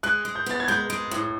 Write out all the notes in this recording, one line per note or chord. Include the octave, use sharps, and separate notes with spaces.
G#3 F#6
G#3
G6
B3 A6
G#6
G#3 G6
G#3
A2